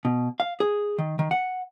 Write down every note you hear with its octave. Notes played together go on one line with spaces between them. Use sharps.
B2
F5
G#4
D#3
D#3
F#5